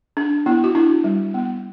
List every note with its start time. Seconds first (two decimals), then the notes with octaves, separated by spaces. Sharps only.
0.17 D4
0.46 B3 E4
0.64 F#4
0.75 D4 E4
1.04 G3
1.34 B3